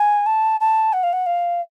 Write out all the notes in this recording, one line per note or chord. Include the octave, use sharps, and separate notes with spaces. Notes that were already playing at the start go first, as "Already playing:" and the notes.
Already playing: G#5
A5
A5
F#5
F5
F#5
F5